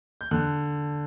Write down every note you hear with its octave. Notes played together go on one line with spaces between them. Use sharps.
G6
D3 F#6